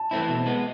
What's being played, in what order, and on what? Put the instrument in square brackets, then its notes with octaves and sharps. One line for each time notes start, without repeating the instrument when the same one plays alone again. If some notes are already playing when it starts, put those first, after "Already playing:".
Already playing: [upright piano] A5
[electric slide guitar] E3 A3 C4 E4
B2
G#3 B3